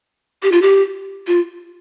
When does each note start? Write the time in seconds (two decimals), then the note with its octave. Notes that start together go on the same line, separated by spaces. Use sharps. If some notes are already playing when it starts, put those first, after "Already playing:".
0.43 G4
0.52 F4
0.62 G4
1.27 F4